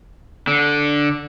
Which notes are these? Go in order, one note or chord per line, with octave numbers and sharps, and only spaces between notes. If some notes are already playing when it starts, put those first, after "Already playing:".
D3